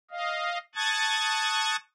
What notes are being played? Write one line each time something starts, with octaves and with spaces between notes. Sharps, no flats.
D#5 F5
A5 C#6 D#6 F#6 G#6 A6